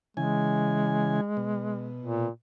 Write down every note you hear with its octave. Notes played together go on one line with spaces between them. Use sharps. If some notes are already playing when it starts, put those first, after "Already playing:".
C#3 E3 G#3 G#5
B2
A#2